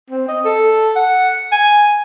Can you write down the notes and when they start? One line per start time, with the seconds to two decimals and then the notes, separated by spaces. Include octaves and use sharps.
0.10 C4
0.28 D#5
0.45 A4
0.96 F#5
1.52 G#5